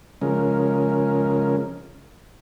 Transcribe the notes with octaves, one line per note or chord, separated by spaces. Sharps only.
C#3 F3 G#3 C#4 A#4